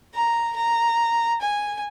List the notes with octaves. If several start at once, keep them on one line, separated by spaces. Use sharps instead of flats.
A#5
A#5
G#5